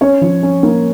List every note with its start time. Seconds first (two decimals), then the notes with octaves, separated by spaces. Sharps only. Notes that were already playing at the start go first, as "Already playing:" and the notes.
0.01 C#4 C#5
0.21 F3
0.43 C#4
0.63 A#3